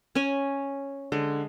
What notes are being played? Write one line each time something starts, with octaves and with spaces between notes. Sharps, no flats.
C#4 C#5 G#5
D3 G#3